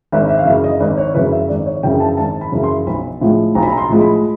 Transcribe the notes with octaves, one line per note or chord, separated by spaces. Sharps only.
G#1 E5
E5
F5
F#2 C#3 E3 E5
D#5
G#1 D5
C#5
F#2 C#3 E3 B4
E5
G#1 D5
C#5
F#2 C#3 E3 G5
A5
G#1 A5
B5
F#2 C#3 E3
C6
B1 B5
A2 F3 G#3
B1 A#5
B5
A#5
C6
A2 F3 G#3
B5